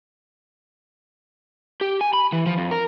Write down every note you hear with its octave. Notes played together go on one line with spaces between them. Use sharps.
G4
G#5
B5
E3
F3
F2
A#4